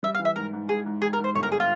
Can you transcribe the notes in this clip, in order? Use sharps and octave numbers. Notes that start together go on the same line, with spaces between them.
G3 E5
F5
E3
E5
G#2 A#4
G#2
G#2 G#4
G#2
G#2 G#4
A#4
G#2
C5
G1 C#5
A#4
G#4
F4